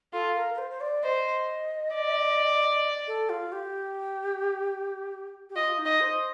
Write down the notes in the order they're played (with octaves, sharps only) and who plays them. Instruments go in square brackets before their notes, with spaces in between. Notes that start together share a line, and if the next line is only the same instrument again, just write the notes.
[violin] F4 [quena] A4
[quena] A#4
A#4
C5
C5
D5
[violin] C5 [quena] D#5
[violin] D5
[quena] A4
F4
G4
G4
[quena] F4 [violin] D#5
[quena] D#4
[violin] D#5
[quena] C5